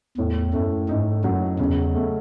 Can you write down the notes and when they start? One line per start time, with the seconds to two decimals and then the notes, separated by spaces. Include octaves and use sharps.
0.18 E2 A2
0.54 F#2 A3
0.89 G#2 D#4
1.24 F#2 F#3
1.59 E2 C#3
1.94 A3